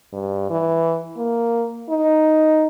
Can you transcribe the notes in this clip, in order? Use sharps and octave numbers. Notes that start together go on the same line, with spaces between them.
G2
E3
A#3
D#4